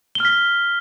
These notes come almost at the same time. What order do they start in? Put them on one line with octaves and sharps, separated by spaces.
G7 F6 B6